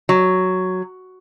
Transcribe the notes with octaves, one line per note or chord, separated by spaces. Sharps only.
F#3